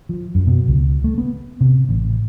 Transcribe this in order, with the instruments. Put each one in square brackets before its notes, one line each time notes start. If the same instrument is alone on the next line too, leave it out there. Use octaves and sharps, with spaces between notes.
[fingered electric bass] F3
F#2
B2
C#2
A3
B3
C3
A1